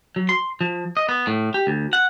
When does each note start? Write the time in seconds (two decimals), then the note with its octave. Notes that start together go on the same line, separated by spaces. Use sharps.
0.16 F#3
0.29 C6
0.61 F3
0.97 D#5
1.09 B3
1.27 A2
1.54 G4
1.67 D2
1.93 F#5